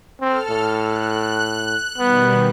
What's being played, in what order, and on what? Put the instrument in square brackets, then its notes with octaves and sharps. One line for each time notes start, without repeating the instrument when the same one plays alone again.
[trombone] C4 [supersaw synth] A4 F6
[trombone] A2
[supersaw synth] F#6
[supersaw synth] B2 D#3 G3 [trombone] B3